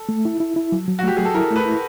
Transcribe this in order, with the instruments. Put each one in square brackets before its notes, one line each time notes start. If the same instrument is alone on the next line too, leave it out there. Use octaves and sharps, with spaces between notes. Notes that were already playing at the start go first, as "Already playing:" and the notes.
Already playing: [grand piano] A4
[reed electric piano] A3
E4
E4
E4
F#3
F#3
[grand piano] F#4
[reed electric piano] A3 [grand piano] G4
[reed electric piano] F#3 [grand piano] G#4
[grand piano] A4
[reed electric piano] E4 [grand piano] A#4
[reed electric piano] A3
[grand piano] B4
[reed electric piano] E4